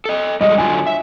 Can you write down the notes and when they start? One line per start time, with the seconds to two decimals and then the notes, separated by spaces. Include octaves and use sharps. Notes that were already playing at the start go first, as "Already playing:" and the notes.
0.05 A4 D#5
0.41 G3 G#3 A4 D#5
0.58 D3 F#3 F4 G#5
0.87 E5